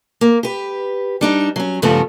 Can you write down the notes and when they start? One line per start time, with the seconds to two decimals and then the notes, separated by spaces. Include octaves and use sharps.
0.21 A#3
0.43 G4 B4
1.21 G3 D4 D#4
1.56 F#3 C#4
1.82 G2 C#3 F3 G3 A3 B3